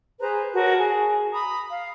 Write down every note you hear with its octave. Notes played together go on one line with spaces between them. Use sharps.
G#4 B4 C5 A#5
F#4 A#4 C#5 A5
G#4
A#5 B5 D#6
F5